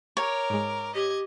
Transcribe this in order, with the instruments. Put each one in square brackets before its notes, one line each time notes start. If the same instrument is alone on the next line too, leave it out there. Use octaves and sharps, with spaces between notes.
[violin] A#4 D6 [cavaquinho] C#5
[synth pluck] G#2 G#3
[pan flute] G4 [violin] D#5 G#6